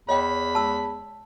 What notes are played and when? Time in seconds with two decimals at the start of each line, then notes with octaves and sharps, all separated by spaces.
0.09 E2 C#5 D#5 G5 B5
0.55 A5 E6